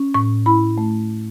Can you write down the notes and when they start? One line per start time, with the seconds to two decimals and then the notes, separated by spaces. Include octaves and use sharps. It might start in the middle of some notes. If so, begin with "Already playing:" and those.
Already playing: C#4
0.14 A2 C#6
0.46 E4 B5
0.78 A3